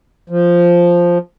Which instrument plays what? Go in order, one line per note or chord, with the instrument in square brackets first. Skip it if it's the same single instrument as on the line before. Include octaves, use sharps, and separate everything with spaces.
[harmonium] F3